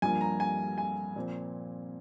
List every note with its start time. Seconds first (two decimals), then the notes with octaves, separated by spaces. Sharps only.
0.02 G2 F3 A#3 G#5
0.21 A#5
0.40 G#5
0.78 G#5
1.16 A#2 F3 C4